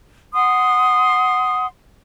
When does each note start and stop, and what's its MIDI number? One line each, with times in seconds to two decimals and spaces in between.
0.34 1.67 78
0.34 1.67 84
0.34 1.67 87